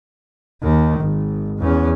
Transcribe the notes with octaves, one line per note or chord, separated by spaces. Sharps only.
D#2 D#3
G#1
E2 C#4